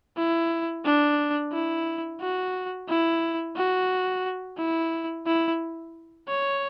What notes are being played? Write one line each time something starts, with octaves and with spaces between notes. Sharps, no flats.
E4
D4
E4
F#4
E4
F#4
E4
E4
C#5